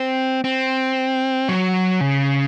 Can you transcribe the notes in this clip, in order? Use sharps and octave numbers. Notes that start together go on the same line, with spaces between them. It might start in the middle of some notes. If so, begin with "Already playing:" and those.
Already playing: C4
C4
F#3
C#3